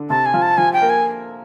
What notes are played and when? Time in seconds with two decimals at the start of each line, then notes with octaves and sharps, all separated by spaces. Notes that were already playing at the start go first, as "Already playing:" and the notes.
Already playing: D3
0.10 C3 A5
0.26 G#5
0.34 F3
0.42 A5
0.57 F3 G#5
0.73 G5
0.82 A#3
0.89 G#5